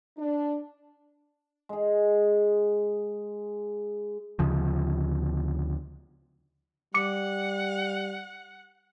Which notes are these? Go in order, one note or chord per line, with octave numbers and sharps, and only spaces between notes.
D4
G#3 G#4
D2 C#3 F3
G3 F#5 D6 C#7